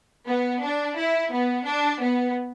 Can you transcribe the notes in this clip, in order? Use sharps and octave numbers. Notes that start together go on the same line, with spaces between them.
B3
D4
E4
B3
D4
B3